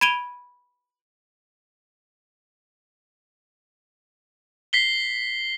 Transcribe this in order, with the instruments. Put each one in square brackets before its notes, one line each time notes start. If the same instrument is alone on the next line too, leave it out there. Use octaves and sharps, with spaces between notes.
[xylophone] B5 G#6 D7 D#7 F7 G7
[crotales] B6 C7 G7